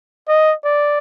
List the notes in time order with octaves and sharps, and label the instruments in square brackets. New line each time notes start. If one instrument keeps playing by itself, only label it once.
[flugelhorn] D#5
D5